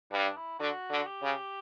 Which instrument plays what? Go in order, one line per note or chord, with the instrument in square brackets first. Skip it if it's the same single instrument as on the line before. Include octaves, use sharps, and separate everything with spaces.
[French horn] G2 [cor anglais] D4
[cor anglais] E4
[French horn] D3 [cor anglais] F#4
[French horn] D3
[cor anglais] G4
[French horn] C#3